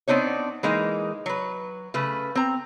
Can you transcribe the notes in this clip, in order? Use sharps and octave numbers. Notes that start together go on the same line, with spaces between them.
B3 C4 D4 D#4 C#5
E3 G#3 A#3 D#4
F#3 B4
C#3 A3 B4
C4 A#5